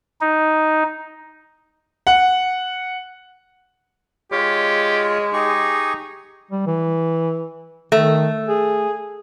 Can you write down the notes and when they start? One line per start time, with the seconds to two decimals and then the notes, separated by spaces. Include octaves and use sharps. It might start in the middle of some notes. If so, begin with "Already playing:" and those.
0.21 D#4
2.07 F#5
4.32 G#3 F4 G4 C#5
5.33 D#4 G4 G#4 C#6
6.51 G3
6.66 E3
7.92 D#3 A3
8.48 G#4